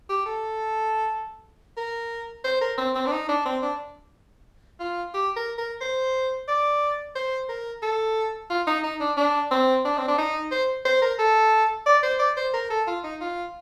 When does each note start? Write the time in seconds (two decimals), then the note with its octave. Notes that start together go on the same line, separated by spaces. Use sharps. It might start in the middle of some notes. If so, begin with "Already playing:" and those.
0.09 G4
0.26 A4
1.77 A#4
2.45 C5
2.61 A#4
2.78 C4
2.95 C4
3.07 D4
3.12 D#4
3.29 D4
3.45 C4
3.62 D4
4.80 F4
5.14 G4
5.36 A#4
5.58 A#4
5.81 C5
6.48 D5
7.15 C5
7.49 A#4
7.83 A4
8.50 F4
8.67 D#4
8.84 D#4
9.00 D4
9.17 D4
9.51 C4
9.85 D4
9.98 C4
10.08 D4
10.18 D#4
10.52 C5
10.85 C5
11.02 A#4
11.19 A4
11.86 D5
12.03 C5
12.19 D5
12.37 C5
12.54 A#4
12.70 A4
12.87 F4
13.04 D#4
13.21 F4